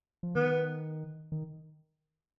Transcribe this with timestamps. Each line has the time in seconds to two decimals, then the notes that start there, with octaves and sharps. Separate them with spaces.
0.23 F3
0.35 D#3 B3
1.32 D#3